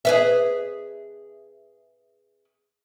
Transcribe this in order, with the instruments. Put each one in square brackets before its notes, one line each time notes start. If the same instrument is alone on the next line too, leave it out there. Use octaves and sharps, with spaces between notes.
[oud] G#4 B4 E5